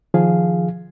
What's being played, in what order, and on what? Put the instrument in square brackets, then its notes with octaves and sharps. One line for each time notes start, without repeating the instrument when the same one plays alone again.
[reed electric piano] D#3 F3 G#4 F5